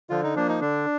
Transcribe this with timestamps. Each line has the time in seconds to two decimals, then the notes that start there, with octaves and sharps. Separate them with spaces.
0.10 D3 F3 F4
0.23 D#4
0.36 F3 A#3 D4
0.48 D#4
0.61 D3 D4